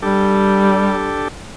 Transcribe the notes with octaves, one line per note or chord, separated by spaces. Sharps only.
G3 D4 G4 A4